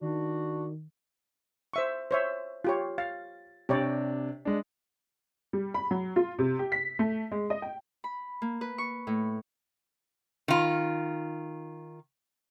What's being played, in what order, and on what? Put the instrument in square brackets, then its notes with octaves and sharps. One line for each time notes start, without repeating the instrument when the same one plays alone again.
[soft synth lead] D#3 [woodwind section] D4 F#4
[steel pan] C5 E5 C#6
C5 C#5 E5
F4 G4 C#5
[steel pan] F5 [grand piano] A6
[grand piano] C3 D4 [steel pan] G4 C#5 D5
[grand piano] G#3 D4
[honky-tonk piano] G3
B5
F#3
F4
C3
G4
B6
A3
G#3
D#5
G5
[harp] B5
A#3
B4
C#6
A2
[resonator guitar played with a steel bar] D#3 F4